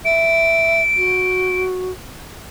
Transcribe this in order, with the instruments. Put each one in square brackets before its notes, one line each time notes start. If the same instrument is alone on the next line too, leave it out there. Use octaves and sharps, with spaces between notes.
[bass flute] E5 [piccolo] D7
[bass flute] F#4